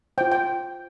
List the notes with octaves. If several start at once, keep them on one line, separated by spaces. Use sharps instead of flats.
F4 C5 G5
G5